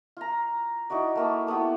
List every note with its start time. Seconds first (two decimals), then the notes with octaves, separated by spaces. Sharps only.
0.17 F4 A#5
0.90 D#4 E4 F#4 D5
1.16 A3 A#3 B4
1.47 A3 B3 E4 G4